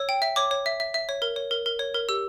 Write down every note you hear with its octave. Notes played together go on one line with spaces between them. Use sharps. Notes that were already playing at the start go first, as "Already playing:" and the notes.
Already playing: C#5 E6
G5
E5
C#5 D6
C#5
E5
E5
E5
C#5
A#4
C#5
A#4
A#4
C#5
A#4
G4 E6